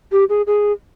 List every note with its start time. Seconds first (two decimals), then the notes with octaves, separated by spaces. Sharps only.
0.12 G4
0.29 G#4
0.47 G#4